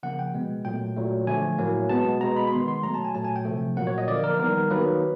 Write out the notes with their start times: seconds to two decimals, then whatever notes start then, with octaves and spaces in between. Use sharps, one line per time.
0.03 C#3 F3 A#3 F#5
0.19 G5
0.34 B2 G#3 B3
0.65 A#2 F#3 A3 G5
0.97 A#2 F#3 A3
1.27 D3 F3 A3 G#5
1.58 A2 F#3 A#3
1.89 B2 G#3 B3 A5
2.20 B2 G#3 B3 A#5
2.37 B5
2.47 B5
2.52 D#3 G#3 B3 C6
2.68 C6
2.83 B2 F#3 A3 A#5
2.94 A5
3.04 G#5
3.15 A#2 F#3 A3 A5
3.25 G#5
3.36 G5
3.45 C3 F3 A3
3.77 A#2 F#3 A#3 F#5
3.87 C#5
3.98 D#5
4.08 D3 F3 A#3 D5
4.24 A#4
4.40 D#3 G3 B3 A#4
4.70 D#3 F#3 A#3 B4